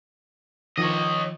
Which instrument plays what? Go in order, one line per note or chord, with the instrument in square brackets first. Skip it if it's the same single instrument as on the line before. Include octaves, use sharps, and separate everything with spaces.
[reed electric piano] D#3 F3 [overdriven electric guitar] C#5 D#5